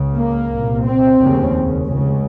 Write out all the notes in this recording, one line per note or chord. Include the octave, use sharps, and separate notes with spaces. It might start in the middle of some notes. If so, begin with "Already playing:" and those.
Already playing: C#2 C#3
A#3
C2 A#2
C4
F1 D#2 C#3
C#2 C#3